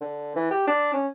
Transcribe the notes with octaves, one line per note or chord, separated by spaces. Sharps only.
D3
E3
G4
D4
C#4